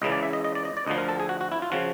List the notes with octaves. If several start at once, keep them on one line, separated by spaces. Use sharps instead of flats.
C#2 C#3 E3 D#5
D5
E5
D#5
D#5
D5
D#5
D5
D2 D3 F3 D#5
A#4
A4
G#4
F#4
F#4
E4
F4
C#3 F3 F#4